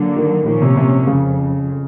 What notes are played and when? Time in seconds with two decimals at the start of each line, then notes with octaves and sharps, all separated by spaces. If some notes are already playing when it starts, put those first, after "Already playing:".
Already playing: D3 F#3 A#3
0.16 D#3
0.46 A#2 D#3 F3 A#3 C#4
0.62 C3
0.77 C3
1.07 F2 C#3